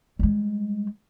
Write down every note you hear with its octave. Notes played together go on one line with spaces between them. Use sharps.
G3 G#3